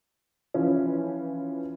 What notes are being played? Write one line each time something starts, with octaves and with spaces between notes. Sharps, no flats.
E3 F3 C#4